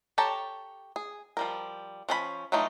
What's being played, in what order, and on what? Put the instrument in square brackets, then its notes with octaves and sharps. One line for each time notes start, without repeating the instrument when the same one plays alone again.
[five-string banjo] G4 A4 C#5 A5 A#5
G#4
F3 G3 A#4
F3 C#4 A4 B5
E3 F#3 A3 D#4 F4